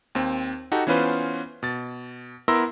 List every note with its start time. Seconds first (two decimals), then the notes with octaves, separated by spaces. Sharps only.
0.15 D#2 C4
0.72 D#4 F#4 G4 A4
0.87 E3 B3 C#4 F4 B4 C5
1.63 B2 A6
2.48 B3 E4 A#4 C6 E6 A#6